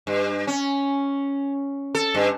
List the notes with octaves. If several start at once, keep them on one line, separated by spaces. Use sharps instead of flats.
G2
C#4
A4
G2